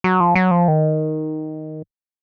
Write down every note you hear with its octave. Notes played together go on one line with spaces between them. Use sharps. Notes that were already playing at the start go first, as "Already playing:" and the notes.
F#3
F3
F#3
F3
D#3